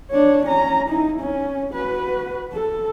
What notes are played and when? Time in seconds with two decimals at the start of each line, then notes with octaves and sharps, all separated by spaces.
0.11 D4 C#5
0.45 C#4 A#5
0.89 D#4 E4
1.19 C#4
1.72 F#4 B4
2.52 A4